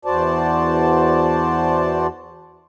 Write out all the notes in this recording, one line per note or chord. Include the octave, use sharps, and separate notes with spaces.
E2 F#4 C5 D5 A5